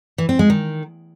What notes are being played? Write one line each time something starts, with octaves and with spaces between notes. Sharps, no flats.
E3
C4
G#3
D#3